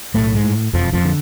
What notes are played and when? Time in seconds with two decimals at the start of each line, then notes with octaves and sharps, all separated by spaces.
0.14 B1 A2 A3
0.34 G#2 G#3
0.44 A2
0.73 E1 F2 F3
0.93 F2 F3
1.04 D3